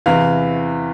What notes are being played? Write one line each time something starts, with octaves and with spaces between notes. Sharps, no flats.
E2 C3 E3 F5